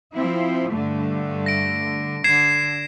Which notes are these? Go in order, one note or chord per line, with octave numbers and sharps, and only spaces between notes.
F3 C4 E4
G2 D3 A3
A#6 D7
D3 G#6 C7 E7